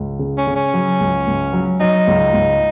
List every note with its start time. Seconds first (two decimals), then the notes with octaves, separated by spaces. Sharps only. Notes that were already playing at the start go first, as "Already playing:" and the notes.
Already playing: C#2
0.19 C#3
0.38 C#4
0.47 C#3
0.56 C#4
0.74 F#3
1.00 C#2
1.27 C#2
1.53 F#3
1.80 F#3 D#4
2.07 C#2
2.34 C#2